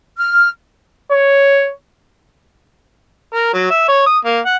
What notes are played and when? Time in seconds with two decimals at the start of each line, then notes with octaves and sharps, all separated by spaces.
0.18 F6
1.12 C#5
3.34 A#4
3.54 F#3
3.70 E5
3.88 C#5
4.06 D#6
4.25 A#3
4.46 F#5